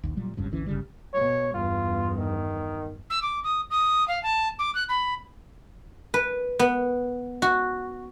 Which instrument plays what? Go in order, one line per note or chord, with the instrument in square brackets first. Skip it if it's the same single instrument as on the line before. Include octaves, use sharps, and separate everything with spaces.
[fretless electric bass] A#1 D#2
A#2 F#3 G3
F#1 C#2 G2 C#3
G#1 D2 E3 C#4
G1 C#3 G3
[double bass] B2 [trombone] C#5
[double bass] E2 G2 [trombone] F4
[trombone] D#3
[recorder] E6
D6
D#6
D#6
F5
A5
D6
F#6
B5
[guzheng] B4
B3
F#4